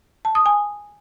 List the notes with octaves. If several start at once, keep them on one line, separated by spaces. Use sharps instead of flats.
A5
D#6
G#5